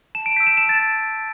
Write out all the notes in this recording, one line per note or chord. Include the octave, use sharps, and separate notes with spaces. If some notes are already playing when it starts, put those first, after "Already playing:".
A5 E7
D7
E6 G6 B6
E7
A5 E7
A6